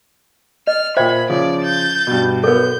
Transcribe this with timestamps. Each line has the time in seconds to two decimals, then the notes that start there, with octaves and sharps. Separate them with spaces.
0.67 D#5 F6
0.97 A#2 C5 E5 G5 B5 G#6
1.30 C#3 F3 C#5 D5
1.62 G6 A6
2.07 G2 B2
2.44 B1 B3 A4 A#4 G6